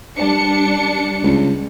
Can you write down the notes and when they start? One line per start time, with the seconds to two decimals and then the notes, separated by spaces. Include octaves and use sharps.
0.17 G3 D4 C#7
1.23 C#2